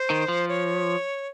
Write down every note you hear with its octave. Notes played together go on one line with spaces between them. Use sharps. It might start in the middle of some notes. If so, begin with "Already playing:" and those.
Already playing: C5
D#3
F3
C#5